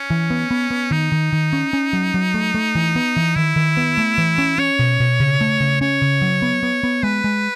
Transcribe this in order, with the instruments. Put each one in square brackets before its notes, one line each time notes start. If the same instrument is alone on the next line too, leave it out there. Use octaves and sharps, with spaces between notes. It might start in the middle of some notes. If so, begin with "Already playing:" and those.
Already playing: [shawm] C#4
[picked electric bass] E3
B3
B3
B3
[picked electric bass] D#3 [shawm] D#4
[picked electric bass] D#3
D#3
C#4
C#4
F#3
F#3
A3
A3
E3
B3
E3
[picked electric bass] D#3 [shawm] E4
[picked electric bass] D#3
B3
A3
E3
C#4
[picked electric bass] C#4 [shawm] C#5
[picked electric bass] B2
B2
C#3
A3
C#3
[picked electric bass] C#4 [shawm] C#5
[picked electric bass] C#3
F#3
B3
B3
B3
[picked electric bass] G#3 [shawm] B4
[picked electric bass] G#3